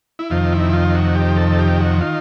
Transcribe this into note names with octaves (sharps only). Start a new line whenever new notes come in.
E4
F2 C3 D#3 F4
E4
F4
F#4
G4
A4
G4
F#4
D#3 F4